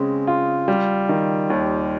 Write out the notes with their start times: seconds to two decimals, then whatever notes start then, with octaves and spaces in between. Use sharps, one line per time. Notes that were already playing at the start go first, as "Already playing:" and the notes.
Already playing: C#3 G#3 C4
0.27 F4
0.68 G3
1.09 D#3
1.50 D#2